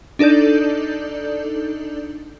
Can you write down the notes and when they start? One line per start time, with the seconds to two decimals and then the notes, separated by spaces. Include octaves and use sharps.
0.19 D4 D#4 A4 D5 G6